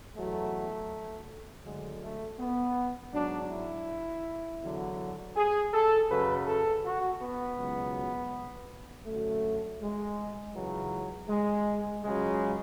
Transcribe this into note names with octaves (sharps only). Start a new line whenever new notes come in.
E2 B2 F#3 A3
D2 D3 F#3 G#3
A3
B3
G#2 F#3 D4
E4
E2 D3 F#3
G#4
A4
F#2 C#3 F#3 B4
A4
F#4
B3
C#2 B2 F#3
F#2 D3 F#3 A3
G#3
C#2 C#3 E3 F#3
G#3
C#2 C#3 F#3 G#3